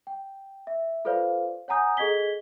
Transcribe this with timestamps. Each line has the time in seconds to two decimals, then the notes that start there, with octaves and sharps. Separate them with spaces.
0.07 G5
0.67 E5
1.05 F4 A4 B4 C5 D5 F5
1.68 C#5 F#5 G#5 A#5 D#6 G6
1.97 G#4 A4 D#5 G#6 B6 G7